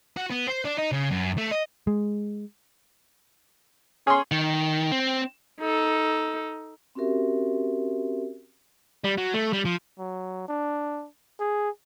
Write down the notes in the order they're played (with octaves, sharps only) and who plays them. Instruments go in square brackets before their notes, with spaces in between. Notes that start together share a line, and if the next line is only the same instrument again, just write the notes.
[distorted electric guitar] F#4
B3
C5
D4
D#4
C#3
F#2
A3
D#5
[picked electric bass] G#3
[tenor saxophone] C#4 [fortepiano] G#4 C6
[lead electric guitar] D#3
C4
[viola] D#4 A4
[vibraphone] C4 C#4 F#4 G4 A#4 E5
[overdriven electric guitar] G3
F#3
A3
G3
F3
[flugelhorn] F#3
D4
G#4